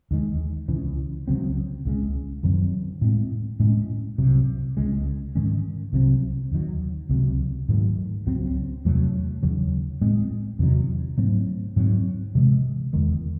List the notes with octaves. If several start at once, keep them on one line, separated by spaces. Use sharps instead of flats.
D#2 D#3 G#3
C#2 C#3 E3
C#2 C#3 F#3 C4
C#2 C#3 G#3
F#2 D#3 F#3 C4
A2 G#3 C4
A2 G#3 C#4
C2 C3 F#3
C#2 C#3 G#3
G#2 D#3 G#3 C#4
C2 C3 F#3 C4
D#2 D#3 F#3
C#2 C3 F#3
G#2 D#3 F#3 A3
C#2 C#3 F#3 C4
E2 C3 F#3 A3
D#2 C#3 F#3
A2 G#3 C4
E2 C3 D#3 F#3
G#2 F#3 A3 C4
G#2 F#3 C4
C3 E3 G#3
E2 D#3 G#3